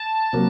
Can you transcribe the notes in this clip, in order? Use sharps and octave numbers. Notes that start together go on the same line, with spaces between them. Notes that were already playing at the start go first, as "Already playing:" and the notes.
Already playing: A5
C3 F#3 A#3